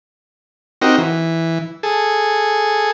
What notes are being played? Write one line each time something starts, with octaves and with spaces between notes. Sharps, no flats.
C4 D#4 F#4 G4 A#4
E3
G#4 A4